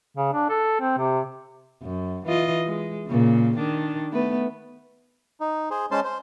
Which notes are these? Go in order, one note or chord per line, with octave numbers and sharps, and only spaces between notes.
C#3
D4
A4
C4
C3
F#2
E3 F4 D#5
G#3
A#2 C#3
D#3 D4
A3 B3 B4
D#4
G#4 C5
G#3 C#4 C5 A5 C6
C5